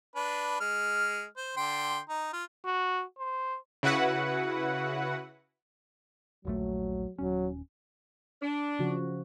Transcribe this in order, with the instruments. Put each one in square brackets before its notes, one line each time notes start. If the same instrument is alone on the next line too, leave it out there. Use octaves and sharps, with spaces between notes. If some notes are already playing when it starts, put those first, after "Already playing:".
[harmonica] D4 B4
G#3 F6
C5
D3 G5 C6
D#4
F4
[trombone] F#4
C5
[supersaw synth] C#3 E4 F#4 B4 F#5
[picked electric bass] D#1 A#1 A3 [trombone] F#3
[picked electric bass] D#1 C#4 [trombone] F#3
[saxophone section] D4
[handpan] C#3 F3 F#4